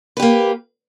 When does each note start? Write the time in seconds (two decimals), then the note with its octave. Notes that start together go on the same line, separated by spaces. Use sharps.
0.17 B4
0.20 G4
0.22 A#3